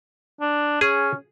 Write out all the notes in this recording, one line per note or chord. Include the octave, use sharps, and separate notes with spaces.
D4
C#4 G#4